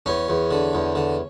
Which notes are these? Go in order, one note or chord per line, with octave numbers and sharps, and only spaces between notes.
E2 C#4
E2
D3
E2
D3